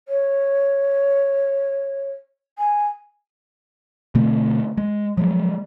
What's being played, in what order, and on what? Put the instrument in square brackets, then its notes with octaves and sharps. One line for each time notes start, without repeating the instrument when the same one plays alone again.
[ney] C#5
G#5
[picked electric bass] B2 D3 A3 C4
G#3
F3 F#3 G#3